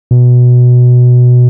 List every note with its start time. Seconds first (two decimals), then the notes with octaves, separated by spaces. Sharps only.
0.11 B2